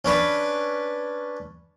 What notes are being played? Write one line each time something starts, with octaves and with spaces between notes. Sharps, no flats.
C#4 D4 B4